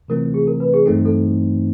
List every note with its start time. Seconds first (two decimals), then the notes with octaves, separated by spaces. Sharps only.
0.08 C3 E3 A3 C4 F4 A#4
0.34 G#4
0.47 A#4
0.60 B4
0.74 G#4
0.86 G2 E3 A3 C4 D#4 A4
1.05 A4